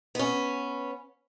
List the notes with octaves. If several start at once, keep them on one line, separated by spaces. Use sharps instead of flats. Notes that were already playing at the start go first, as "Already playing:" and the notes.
B3 C#4